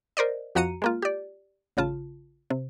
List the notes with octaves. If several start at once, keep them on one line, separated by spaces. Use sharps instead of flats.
A#4 C5 D5 D#5
F2 F3 F#4 A#5 C#7 D#7
G#3 A#3 F4
G4 D5
A1 C#3 F4 A5
C3